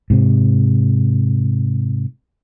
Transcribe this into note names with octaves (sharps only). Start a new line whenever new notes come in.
G#2 C3